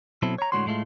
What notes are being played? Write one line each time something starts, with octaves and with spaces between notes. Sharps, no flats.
B2 F#3 C4 E4 A4
C#5 A#5
A2 D3 G#3 F#4 C#5 C6
A2 G#3 A3 F4